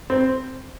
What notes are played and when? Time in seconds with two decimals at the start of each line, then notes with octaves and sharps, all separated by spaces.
0.10 C4